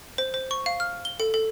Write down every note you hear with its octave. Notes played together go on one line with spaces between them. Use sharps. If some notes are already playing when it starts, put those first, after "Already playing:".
C5
C5
C#6
F5
F6
G7
A4
A4